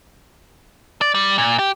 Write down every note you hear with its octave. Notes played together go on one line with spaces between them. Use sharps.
D5
G3
A#2
G4